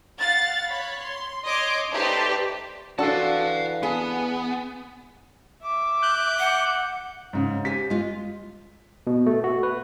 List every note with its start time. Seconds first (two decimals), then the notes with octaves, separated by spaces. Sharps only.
0.19 F5 F#5 A6
0.68 C#5 B5
1.02 C6
1.46 C#5 D#5 C6 D6
1.92 A3 D#4 G4 B4 C5 D5
2.99 E3 D4 F#4 A4 F5 A5
3.83 B3 G#4
5.64 E5 D6
6.02 F#6 G6
6.39 F#5
7.33 G#2 C#3
7.65 G4 C5 G#5 B6
7.90 G#3 F4
9.07 B2
9.26 A3
9.44 F#4
9.63 B4